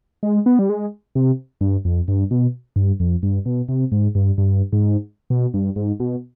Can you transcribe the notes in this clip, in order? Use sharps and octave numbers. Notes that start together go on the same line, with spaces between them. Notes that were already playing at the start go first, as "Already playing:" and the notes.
G#3
B3
G3
G#3
C3
G2
F2
G2
B2
G2
F2
G2
B2
C3
G#2
G2
G2
G#2
B2
G2
G#2
B2